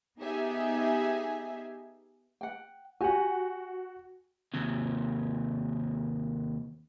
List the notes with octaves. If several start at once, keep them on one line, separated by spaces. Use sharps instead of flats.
B3 D#4 G4 G#4 E5 G#5
F#5 G5
F#4 G4 F#5 G#5
D#2 C3